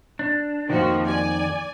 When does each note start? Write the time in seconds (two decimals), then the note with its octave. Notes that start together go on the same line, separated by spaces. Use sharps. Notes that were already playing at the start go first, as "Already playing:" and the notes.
0.19 D4
0.70 F2 G#2 D#3 F3 A#3 F#4
1.06 D5 G#5